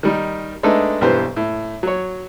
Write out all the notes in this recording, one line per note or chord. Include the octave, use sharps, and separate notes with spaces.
D#3 G3 D#4
G#3 A3 B3 D4 D#4 A4
B1 G2 E3 G4 C5
A2
F#3 C#5